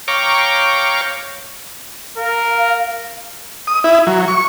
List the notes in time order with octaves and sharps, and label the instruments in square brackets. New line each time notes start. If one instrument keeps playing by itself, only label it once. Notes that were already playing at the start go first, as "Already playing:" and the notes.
[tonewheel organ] C#5 F5 G5 A#5 C#6 D6
[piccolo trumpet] A#4 [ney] F5
[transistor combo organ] D#6
E4
F#3
C#6